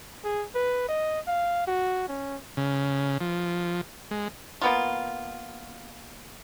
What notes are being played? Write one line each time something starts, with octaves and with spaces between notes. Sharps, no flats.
G#4
B4
D#5
F5
F#4
C#4
C#3
F3
G#3
A#3 B3 F4